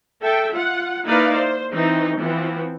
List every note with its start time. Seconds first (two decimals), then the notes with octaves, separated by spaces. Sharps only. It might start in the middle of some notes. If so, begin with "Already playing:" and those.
0.23 A4 E5 G5
0.53 F4 F#5
1.05 A#3 D#4 E4 B4 D5 F5
1.35 C5
1.71 E3 C4 D#4
2.19 E3 F3 B3 C4